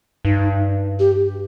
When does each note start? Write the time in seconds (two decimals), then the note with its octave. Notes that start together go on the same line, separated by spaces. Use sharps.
0.25 G2 D#4
0.99 G4